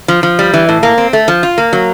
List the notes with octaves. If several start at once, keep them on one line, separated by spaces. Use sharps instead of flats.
F3
F3
G3
E3
A2
A#3
C4
A3
F3
F4
A#3
F#3